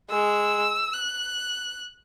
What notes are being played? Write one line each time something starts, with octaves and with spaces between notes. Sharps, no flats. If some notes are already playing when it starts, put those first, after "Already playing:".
G#3 E6
F#6